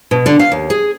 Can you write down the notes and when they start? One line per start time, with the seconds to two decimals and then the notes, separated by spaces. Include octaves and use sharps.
0.11 B2
0.26 D3
0.39 F5
0.52 D#2
0.70 G#4